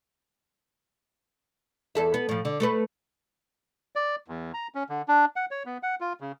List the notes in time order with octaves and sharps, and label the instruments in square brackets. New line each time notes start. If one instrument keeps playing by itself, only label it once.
[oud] E2 A4 E5
B3
A2 F3
D3
A3 A4 B4
[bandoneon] D5
E2
A#5
C#4
D3
D4
F#5
C#5
B3
F#5
F4
C#3